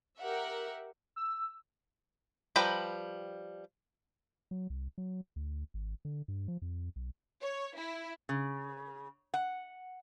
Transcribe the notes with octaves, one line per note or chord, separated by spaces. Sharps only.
G4 A#4 E5 F#5
E6
F3 G3 B4 G5 A#5
F#3
C2
F#3
D2
G#1
D3
G2
F3
F2
B1
C#5
E4
C#3
F#5